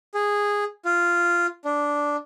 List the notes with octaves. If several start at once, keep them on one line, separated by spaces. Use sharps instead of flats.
G#4
F4
D4